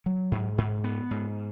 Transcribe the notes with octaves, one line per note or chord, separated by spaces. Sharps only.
F#3
G#2
G#2
B3
G#2